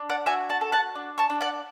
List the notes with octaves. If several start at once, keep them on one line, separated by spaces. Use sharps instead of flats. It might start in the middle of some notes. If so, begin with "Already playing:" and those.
Already playing: D4
D5 F#5
F#4 E5 G#5
F#5 A5
A4
F#5 A5
D4
A5 C#6
D4
D5 F#5